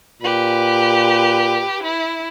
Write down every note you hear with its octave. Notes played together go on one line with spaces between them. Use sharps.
A#2 G4 B4
E4